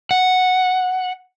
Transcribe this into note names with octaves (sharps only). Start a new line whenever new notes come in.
F#5